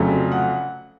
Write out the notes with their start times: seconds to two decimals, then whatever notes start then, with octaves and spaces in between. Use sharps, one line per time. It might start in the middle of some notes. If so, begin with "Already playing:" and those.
Already playing: F1 F2 C#3 F#3 A3
0.32 F#5